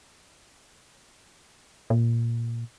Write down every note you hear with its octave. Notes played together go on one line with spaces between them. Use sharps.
A#2